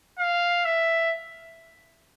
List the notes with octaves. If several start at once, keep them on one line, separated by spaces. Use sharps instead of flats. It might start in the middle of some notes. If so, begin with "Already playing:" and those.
F5
E5